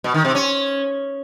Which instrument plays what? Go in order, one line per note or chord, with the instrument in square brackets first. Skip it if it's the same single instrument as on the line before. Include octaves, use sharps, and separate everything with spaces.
[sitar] B2
D#3
C3
C#4